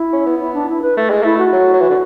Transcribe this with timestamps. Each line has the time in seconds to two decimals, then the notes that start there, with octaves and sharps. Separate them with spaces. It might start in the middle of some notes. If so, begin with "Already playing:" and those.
Already playing: E4
0.12 C#4
0.26 B3
0.41 E4
0.54 D4
0.69 E4
0.82 B4
0.97 A3
1.10 G#3
1.23 A3 E4
1.38 F#4
1.53 F#3
1.73 F#3
1.81 E3
1.90 D3